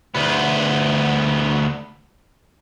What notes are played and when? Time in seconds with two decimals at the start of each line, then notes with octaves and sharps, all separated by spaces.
0.15 D2 B3